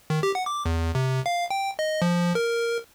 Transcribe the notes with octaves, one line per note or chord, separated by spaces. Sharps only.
D#3
G4
F#5
D6
E2
C3
F5
G5
D#5
F3
A#4